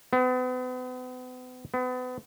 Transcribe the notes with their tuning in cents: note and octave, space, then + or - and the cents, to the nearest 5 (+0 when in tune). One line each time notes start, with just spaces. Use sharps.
B3 +40
B3 +35